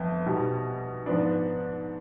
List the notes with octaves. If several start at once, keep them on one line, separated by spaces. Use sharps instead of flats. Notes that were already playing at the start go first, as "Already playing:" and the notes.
Already playing: G1 F2 B3
B1 B2 G3
G#2 F3 B3 D4